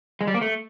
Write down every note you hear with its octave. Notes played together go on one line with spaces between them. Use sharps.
G#3
G3
A#3
A3